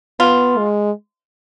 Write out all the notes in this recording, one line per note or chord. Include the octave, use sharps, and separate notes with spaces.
B3 F4
G#3